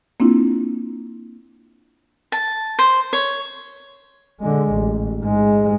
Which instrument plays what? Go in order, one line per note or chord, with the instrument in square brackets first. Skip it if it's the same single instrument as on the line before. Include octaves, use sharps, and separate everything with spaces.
[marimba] A#3 C4 D4 E4 F4
[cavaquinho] A5
C5
C#5
[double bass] D3 G#3
A1
G#2 G#3